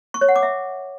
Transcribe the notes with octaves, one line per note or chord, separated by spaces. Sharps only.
C#6
C#5
F#5
D6
E5